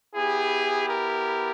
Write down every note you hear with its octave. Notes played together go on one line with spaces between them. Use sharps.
B3 E4 G4 G#4
A#4